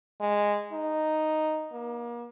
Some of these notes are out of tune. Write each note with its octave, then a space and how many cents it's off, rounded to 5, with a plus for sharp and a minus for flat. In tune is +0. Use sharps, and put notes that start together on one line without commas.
G#3 -10
D#4 -5
A#3 +35